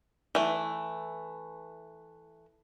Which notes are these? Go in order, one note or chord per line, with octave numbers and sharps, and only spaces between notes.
E3 A3